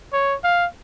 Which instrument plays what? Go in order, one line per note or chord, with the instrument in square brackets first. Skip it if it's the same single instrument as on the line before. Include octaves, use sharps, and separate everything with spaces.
[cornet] C#5
F5